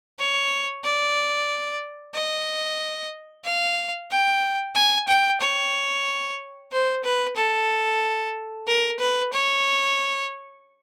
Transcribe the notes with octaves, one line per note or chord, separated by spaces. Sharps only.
C#5
D5
D#5
F5
G5
G#5
G5
C#5
C5
B4
A4
A#4
B4
C#5